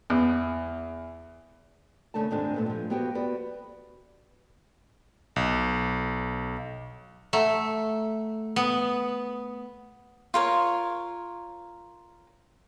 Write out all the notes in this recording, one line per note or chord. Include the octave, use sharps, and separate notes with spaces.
E2
D#2 C#3 A3 A#3 D4 A5
D#2 G#2 D#3 G#3 C4 D4
A#2 A3 B3
G2 F3
A#3 B3 F#4 G4 B4 C5
B3 F#4 B4 D5
B1
A3 E5 F#5 A#5
B3 D#6
F4 A#4 C#5